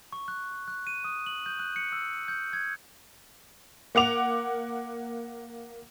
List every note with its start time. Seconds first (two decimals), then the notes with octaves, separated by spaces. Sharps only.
0.12 C#6
0.28 F#6
0.68 F#6
0.87 D#7
1.04 D#6
1.26 F#7
1.46 G6
1.59 F#6
1.76 C#7
1.92 E6
2.28 G6
2.53 G#6
3.95 A#3 F#5 D6 F7